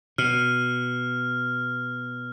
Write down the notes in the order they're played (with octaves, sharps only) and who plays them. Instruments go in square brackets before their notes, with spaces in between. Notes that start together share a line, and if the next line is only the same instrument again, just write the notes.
[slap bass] B2 [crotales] F6